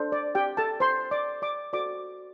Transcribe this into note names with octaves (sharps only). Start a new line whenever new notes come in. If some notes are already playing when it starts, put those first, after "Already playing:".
Already playing: D4 A4 C5
D5
G4 G5
A4 A5
C5 C6
D5 D6
D5 D6
F#4 A4 C5 D5 D6